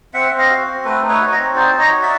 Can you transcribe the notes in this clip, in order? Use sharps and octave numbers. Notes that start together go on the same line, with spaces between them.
C4 E5 F#5
C4
D#5 F5
F#4
C4
A3 A4 B4
D#4
B4 C#5
F#4
C#5 D#5
C4
D#4 C5 D5
D#4
C#5 D#5
F#4
D5 E5